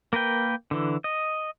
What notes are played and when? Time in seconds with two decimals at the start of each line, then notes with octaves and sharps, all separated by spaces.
0.13 A#3 A#4 B4 G5
0.71 D3 E3
1.04 D#5